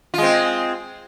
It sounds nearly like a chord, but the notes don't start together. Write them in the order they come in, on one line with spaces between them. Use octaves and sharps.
F4 G#3 C4